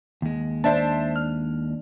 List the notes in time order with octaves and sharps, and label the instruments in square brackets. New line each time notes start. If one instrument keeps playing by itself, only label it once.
[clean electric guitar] D#2 G#3
[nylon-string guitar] D4 [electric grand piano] C5 E5 A5
[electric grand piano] F6